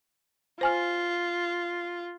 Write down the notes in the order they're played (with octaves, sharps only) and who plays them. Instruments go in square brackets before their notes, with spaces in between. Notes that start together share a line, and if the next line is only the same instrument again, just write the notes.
[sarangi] F4 [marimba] C5 G#5 F6